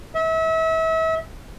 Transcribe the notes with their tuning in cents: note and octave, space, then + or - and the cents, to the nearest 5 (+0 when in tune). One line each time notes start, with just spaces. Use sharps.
E5 -35